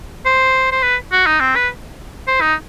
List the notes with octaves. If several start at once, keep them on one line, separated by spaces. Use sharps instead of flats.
C5
C5
B4
F#4
D#4
C4
B4
C5
D#4